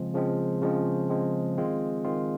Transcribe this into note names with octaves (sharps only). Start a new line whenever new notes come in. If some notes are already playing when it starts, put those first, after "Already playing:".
Already playing: C#3 F3 G#3 C4
C#3 F3 G#3 C4
C#3 F3 G#3 C4
C#3 F3 G#3 C4
D#3 G#3 C4 F4
D#3 G#3 C4 F4